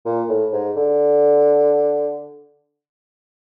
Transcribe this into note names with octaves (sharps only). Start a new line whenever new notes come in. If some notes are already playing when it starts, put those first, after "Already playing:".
A#2
A2
G#2
D3